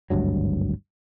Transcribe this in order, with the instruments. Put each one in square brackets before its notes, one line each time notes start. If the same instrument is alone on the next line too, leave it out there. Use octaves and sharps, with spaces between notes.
[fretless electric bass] G#1 D2 G2 F#3